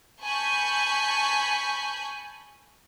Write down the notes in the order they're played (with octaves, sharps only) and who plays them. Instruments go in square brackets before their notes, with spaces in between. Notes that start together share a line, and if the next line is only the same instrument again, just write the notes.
[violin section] G#5 A5 B5 C#6 G6